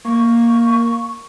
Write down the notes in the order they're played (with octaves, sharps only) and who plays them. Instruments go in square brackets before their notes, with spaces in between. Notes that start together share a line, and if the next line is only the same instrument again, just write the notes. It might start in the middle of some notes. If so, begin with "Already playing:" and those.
[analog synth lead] A#3 [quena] C#6